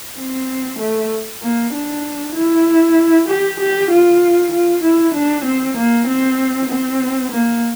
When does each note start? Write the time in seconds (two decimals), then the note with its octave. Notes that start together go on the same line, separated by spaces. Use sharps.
0.18 C4
0.79 A3
1.42 A#3
1.73 D4
2.36 E4
3.28 G4
3.60 G4
3.91 F4
4.52 F4
4.83 E4
5.14 D4
5.45 C4
5.77 A#3
6.07 C4
6.70 C4
7.32 A#3